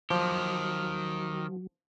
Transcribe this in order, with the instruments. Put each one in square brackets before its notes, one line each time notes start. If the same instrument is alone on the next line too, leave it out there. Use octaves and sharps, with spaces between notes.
[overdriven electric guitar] D#3 G4 [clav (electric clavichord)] F3 [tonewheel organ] F#3